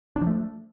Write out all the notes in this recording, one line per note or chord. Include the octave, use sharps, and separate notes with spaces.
D4
F3
A3